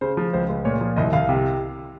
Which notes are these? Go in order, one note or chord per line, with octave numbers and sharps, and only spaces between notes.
C#3 C5
F3
C#2 C5
C#2
A#2 C#5
F3
C2 D#5
C2 F5
C3